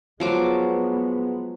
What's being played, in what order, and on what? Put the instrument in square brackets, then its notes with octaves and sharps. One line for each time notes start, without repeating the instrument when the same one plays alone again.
[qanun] F3 F#3 D6 [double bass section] G#3 B3